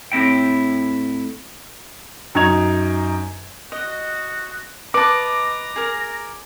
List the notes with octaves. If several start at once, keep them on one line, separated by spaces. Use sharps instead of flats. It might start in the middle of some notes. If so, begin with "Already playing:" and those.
A2 C4 E4 G5
F#2 D#4 A#5 G#6 F7
F#4 D#5
B4 D#5 A5 A#5 D6
G#4 A#4